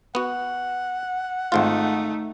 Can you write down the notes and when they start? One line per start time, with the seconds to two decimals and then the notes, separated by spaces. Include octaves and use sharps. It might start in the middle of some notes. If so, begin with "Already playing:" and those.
0.15 B3 F#4 F#5
1.52 G#1 G#2 A3 D#4 F4